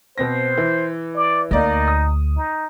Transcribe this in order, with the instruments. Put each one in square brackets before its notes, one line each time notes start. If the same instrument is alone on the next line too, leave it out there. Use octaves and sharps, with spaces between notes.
[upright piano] B2 C4 A#6 [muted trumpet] C5
[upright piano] E3
[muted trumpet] D5
[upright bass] D2 [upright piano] A#3 D5 D#5 [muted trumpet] D#4
[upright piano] D#6
[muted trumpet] D#4